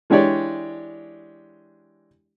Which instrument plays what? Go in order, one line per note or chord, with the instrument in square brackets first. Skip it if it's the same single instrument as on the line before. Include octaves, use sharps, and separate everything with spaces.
[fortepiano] E3 G#3 D4 G4 C#5 D5